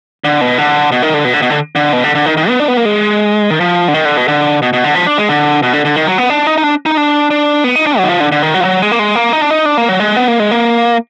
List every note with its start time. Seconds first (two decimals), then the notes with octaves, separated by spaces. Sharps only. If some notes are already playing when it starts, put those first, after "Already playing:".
0.24 D3
0.41 B2
0.58 D3
0.92 B2
1.02 D#3
1.14 D3
1.25 B2
1.34 D3
1.42 B2
1.50 D3
1.76 D3
1.93 B2
2.04 D3
2.15 D3
2.26 D#3
2.37 D#3
2.48 B3
2.60 D4
2.68 B3
2.77 A#3
2.85 G#3
3.50 D#3
3.60 F3
3.88 D3
3.94 D#3
4.05 D3
4.17 B2
4.28 D3
4.62 B2
4.73 B2
4.84 D3
4.95 F3
5.07 D4
5.18 G#3
5.29 D3
5.63 B2
5.73 D3
5.85 D3
5.96 D#3
6.07 F#3
6.18 B3
6.30 D4
6.47 D#4
6.58 D#4
6.63 D4
6.86 D#4
6.97 D4
7.31 D4
7.64 B3
7.76 D#4
7.86 D4
7.98 F#3
8.04 D#3
8.09 F3
8.20 D3
8.32 D3
8.42 D#3
8.54 F#3
8.61 F3
8.65 F#3
8.82 G#3
8.92 A#3
8.99 G#3
9.15 A#3
9.33 D#4
9.41 D4
9.50 D#4
9.66 D4
9.77 A#3
9.88 F#3
10.00 G#3
10.16 B3
10.28 A#3
10.40 G#3
10.51 A#3